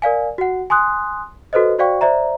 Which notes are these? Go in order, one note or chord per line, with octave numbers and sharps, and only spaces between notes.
A#4 D5 F5 G#5
F#4 F#5
G#5 C6 D#6 F#6
F#4 A4 B4 C5 D#5
F#4 C5 D5 F5 G5 C#6
C5 D5 E5 A#5